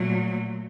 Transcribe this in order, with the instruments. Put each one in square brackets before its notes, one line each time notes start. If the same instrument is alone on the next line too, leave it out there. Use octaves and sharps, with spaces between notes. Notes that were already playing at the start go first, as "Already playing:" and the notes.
Already playing: [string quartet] A#2 F#3 A3